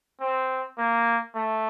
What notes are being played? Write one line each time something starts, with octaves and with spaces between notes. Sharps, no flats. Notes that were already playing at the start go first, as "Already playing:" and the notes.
C4
A#3
A3